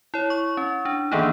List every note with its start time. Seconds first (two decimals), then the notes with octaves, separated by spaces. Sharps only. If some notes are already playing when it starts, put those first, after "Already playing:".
0.14 E4 C#5
0.30 C#6
0.57 C#4
0.85 D4
1.12 D#3 E3 A#3 B3 D4 D#4